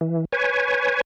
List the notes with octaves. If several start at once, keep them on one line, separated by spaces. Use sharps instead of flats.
E3
B4 C#5 G#5